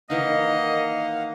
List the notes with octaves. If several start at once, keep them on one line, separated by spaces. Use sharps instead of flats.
D#3 E3 A#3 D#4 D#5 F5 F#5